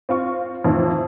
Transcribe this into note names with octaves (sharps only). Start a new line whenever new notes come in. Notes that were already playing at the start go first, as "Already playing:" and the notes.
C4 F4 C#6
F2 A2 D#3 E3